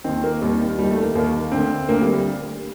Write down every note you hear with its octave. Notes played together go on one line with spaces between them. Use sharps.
D#2 D#3 C4
A#3
D#2 D#3 G3
D#2 D#3 G3
A3
A#3
D#2 D#3 A#3
D2 D3 C4
D2 D3 A#3
G3
G3